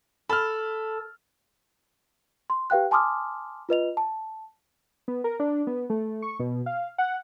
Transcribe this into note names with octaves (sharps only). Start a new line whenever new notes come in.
A4 B5 F6
C6
G4 B4 F5 G5 F#6
G#5 A5 C6 D6 D#6 F6
F4 B4 D#5 F7
A5
B3
A#4
D4
B3
A3
C#6
B2
F5
F#5